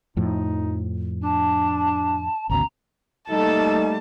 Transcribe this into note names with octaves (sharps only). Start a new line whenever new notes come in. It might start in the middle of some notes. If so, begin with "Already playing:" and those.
F2 A2 F3 D#4
D4 A5
G#1 D2 B2 C#4 A#5
G3 A3 A#3 D#4 A4 A5